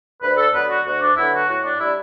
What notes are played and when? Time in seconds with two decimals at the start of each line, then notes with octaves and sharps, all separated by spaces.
0.22 D2 B4
0.37 A4
0.53 D3 F#3 B3 B4
0.69 F#4
0.85 D2 F#4
1.01 D4
1.17 D3 F#3 B3 E4
1.33 F#4
1.49 A2 F#4
1.65 D4
1.80 G3 D4 E4